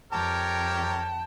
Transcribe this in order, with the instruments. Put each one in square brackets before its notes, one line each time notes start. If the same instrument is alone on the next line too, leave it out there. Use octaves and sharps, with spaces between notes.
[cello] F2 G5 [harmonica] G4 A#4 C#5 [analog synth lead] A5